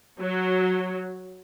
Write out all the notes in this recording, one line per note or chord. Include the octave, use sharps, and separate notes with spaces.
F#3